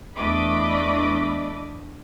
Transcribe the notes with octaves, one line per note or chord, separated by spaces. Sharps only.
E2 A3 D4 D#5 B5 D6